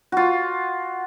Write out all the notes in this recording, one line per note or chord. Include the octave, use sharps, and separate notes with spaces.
F4 F#4